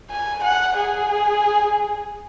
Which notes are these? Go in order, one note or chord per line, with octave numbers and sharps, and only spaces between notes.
G#5
F#5
G#4